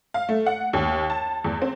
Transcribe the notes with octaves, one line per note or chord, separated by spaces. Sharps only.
F5
A3
F#5
D#2
A5
E2
C4